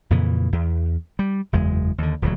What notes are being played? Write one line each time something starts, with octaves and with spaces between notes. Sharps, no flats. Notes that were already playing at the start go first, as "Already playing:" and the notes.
F2 A#2 C#3 E3
E2
G3
F#1 E2 G#3
D#2 D3
D#1 D2 C3 F#3